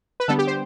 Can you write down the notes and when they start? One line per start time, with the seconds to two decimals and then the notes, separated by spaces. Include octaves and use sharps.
0.20 B4
0.28 D3 G3 B3 A4
0.39 G4
0.47 C5